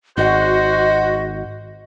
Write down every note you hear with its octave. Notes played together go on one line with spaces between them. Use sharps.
G#1 F#4 C5 D#5